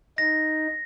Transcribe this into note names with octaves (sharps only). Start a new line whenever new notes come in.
D#4 A#6